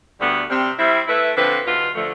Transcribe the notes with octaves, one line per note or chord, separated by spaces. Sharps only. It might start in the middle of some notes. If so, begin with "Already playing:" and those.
D2 D3 G3 B3
C3 G3 C4 G4
G3 C4 E4
A3 E4 B4 E5
D3 F3 C4 F4 B4
E2 B2 B3 F4
D3 F3 A3